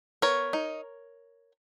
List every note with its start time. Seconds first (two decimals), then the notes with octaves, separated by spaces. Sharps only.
0.22 B3 A#4 C#5
0.53 D#4